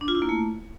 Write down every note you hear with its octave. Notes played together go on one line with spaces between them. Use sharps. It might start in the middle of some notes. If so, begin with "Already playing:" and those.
D4
F4
E4
A#3
A3